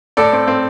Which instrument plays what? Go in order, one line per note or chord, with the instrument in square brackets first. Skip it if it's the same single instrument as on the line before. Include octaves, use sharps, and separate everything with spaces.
[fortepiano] A2 A4 D5
C4
C4